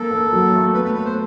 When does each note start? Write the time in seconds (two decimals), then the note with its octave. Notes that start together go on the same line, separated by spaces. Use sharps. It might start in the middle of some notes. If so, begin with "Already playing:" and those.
Already playing: A#3 A4
0.11 A#3
0.32 F#3
0.53 A3
0.74 B3 B4
0.84 B4
0.95 B3 B4
1.05 C5